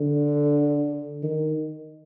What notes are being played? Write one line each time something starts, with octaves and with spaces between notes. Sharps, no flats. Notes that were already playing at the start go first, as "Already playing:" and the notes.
Already playing: D3
D#3